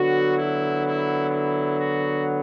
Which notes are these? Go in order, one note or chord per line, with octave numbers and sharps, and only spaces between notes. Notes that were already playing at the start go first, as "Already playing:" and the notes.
Already playing: D3 F#3 B3 F#4
E4
E4
E4
F#4